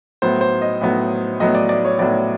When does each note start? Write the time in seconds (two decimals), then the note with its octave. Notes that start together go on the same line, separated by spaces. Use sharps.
0.22 A2 F#3 B3 C5
0.41 C5
0.61 D#5
0.81 A2 F#3 B3
1.40 A2 F#3 B3 D#5
1.55 D5
1.69 D5
1.85 C#5
1.99 A2 F#3 B3 D5